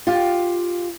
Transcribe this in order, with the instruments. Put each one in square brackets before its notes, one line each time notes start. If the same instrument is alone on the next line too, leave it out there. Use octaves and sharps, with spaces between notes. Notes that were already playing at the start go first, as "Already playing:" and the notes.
[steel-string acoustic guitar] F4 G4